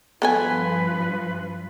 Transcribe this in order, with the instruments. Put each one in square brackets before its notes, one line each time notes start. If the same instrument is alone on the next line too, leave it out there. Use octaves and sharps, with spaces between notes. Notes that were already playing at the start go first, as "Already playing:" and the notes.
[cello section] G2 F3 [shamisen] B3 A4 G#5 [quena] B4